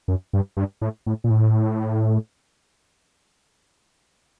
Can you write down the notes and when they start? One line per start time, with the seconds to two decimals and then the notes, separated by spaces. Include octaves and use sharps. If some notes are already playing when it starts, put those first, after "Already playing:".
0.08 F#2
0.33 G2
0.57 G2
0.81 A2
1.06 A2
1.24 A#2
1.30 A2